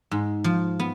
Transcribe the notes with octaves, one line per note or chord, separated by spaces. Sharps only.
G#2
F3
B3